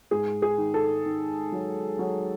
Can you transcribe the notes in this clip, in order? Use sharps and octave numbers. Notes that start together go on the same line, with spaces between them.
G#2 G#4
G#4
D#3
A4
D#3
F#3
F#3